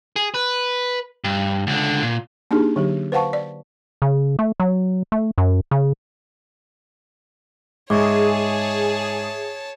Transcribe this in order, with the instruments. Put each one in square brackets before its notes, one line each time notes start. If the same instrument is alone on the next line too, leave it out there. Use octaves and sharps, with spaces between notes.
[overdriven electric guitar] G#4
B4
G2
C#2 D3
A#2
[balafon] A#3 D4 D#4 G4 G#4
D3 F#3 G4
B4 C5 F5 F#5 A5 C#6
D5
[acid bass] C#3
A3
F#3
A3
F#2
C#3
[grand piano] G#2 [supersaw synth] G#4 [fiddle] C#5 A5 [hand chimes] E5 C#6 D6